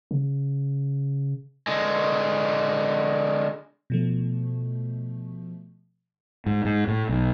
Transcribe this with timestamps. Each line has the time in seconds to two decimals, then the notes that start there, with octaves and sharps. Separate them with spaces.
0.11 C#3
1.67 D3 G#3
3.90 B2 F3 A3
6.46 G#2
6.65 G#2
6.88 A2
7.09 B1